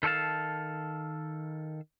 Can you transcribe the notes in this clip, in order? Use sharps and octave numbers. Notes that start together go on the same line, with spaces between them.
D#3 A4 C#5 F5 A5